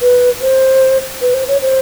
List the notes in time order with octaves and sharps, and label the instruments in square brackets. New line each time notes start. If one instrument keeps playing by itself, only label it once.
[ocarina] B4
C5
B4
C5
C#5
C5